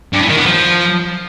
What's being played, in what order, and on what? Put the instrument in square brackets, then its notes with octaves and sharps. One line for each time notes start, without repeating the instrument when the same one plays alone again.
[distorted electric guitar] G2
E3
D#3
B3
F3